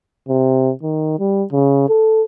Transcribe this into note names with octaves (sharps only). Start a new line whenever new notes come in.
C3
D#3
G3
C#3
A4